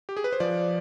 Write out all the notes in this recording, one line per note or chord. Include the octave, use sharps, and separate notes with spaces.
G4
G#4
B4
C5
F3 D5